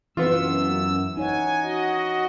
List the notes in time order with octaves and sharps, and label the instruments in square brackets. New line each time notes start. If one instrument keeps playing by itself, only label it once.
[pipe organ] F#2 E6 [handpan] E3 [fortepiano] B3 F4
[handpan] D#4 C#5 F#5 [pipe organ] G#5
[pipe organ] F#4 D#5